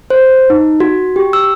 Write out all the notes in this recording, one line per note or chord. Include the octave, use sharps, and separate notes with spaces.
C5
D#4
F#4
G4
E6